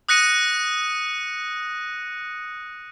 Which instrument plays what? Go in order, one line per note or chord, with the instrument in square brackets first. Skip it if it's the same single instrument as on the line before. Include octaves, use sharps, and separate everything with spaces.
[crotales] D#6 F#6 A#6 C#7 D#7